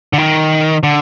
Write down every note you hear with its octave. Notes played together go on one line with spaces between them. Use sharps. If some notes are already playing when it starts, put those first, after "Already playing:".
D3
D#3
D3